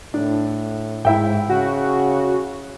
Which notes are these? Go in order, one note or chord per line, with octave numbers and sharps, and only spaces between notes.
A2 D4
G#2 E4 E5 G5
C#3 F#4